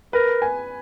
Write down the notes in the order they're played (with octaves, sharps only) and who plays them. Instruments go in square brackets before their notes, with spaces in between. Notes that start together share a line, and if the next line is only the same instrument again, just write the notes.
[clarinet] A#4 [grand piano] B4
[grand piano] G#5